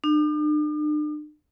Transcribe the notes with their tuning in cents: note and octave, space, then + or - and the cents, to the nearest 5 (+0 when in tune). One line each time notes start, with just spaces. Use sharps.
D4 +45